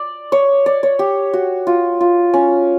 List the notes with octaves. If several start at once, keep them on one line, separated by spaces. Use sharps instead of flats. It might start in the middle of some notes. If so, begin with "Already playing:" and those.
Already playing: D5
C#5
D5
C#5
G4
F#4
F4
F4
C#4